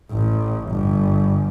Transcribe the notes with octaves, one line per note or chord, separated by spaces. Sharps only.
A1
G1